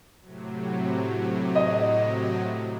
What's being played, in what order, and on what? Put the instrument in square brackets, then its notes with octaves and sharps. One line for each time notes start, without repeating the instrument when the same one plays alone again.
[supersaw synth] A2 C3 F#3
[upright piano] D#5